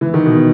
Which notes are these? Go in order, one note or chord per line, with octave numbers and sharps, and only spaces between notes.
E3
D#3
B2